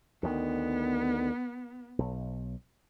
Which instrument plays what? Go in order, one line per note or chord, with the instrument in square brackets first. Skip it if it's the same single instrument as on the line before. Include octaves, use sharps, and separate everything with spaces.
[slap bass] D2 D#3 [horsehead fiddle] B3
[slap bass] B1